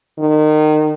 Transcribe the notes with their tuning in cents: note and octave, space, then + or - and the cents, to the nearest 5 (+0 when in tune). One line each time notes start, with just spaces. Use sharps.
D#3 -25